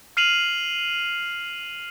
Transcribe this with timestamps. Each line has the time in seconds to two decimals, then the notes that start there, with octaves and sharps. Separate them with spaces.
0.17 F6 C7 D#7 F7 F#7